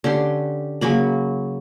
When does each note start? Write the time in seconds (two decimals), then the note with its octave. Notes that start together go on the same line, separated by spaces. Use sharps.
0.04 D3 C#4 G4 C6
0.81 C#3 F#3 A#3 B5